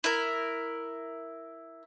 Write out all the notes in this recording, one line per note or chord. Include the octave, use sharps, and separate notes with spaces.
E4 A#4